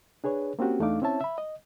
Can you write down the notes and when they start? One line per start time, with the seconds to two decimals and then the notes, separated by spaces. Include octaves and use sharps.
0.24 D4 G#4 B4 C#5
0.59 A#3 C4 C#4 F#4 G4
0.80 E2 A3 D4 D#4 F5 D6
1.02 C4 C#4 E4 C#5 E5 A5
1.21 E5 B5
1.38 D#5